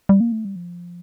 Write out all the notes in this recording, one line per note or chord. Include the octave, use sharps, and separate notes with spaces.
G3
A#3
A3
G3
F3